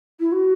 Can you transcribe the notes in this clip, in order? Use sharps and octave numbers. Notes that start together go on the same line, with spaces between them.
E4
F#4